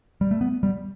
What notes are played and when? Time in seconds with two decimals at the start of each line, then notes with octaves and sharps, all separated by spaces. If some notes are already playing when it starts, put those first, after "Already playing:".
0.21 G3
0.31 A3
0.41 B3
0.63 G3